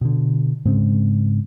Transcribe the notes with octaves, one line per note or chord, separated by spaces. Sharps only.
B2 D3
G#2 C#3 G#3 C4